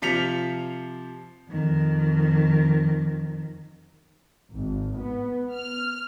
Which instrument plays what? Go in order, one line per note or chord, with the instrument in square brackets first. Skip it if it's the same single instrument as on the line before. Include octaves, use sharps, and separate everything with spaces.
[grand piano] C3 F3 B6 C#7 F7
[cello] F2 D#3
[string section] G#1
B3
F6